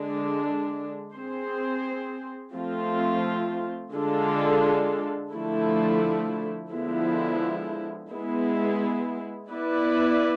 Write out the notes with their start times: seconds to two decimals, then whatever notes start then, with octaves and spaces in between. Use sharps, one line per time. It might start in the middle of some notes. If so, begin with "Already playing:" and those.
Already playing: D3 G#3 D4
1.14 C4 G#4 C5
2.54 F3 A3 C4 F4
3.93 D3 G#3 D4 F4 A4
5.32 D3 F3 A3 E4 A4
6.71 D3 F3 G#3 B3 E4
8.10 G#3 B3 E4
9.49 B3 E4 B4 D5